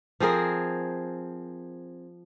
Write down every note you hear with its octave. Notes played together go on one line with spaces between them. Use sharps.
F3 C4 G#4 A#4